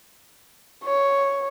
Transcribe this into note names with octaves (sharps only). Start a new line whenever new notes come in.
C#5